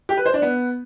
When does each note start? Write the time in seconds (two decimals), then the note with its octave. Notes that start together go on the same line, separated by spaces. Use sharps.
0.09 G4
0.17 B4
0.26 C5
0.34 D4
0.42 B3